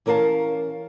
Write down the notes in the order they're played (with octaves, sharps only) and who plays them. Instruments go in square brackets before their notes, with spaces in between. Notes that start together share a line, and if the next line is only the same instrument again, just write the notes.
[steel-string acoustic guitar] E3 C#4 A#4 D5 F5 A5